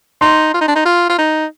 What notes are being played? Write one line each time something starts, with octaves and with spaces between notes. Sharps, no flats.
D#4 C6
F4
D#4
D4
D#4
F4
F4
D#4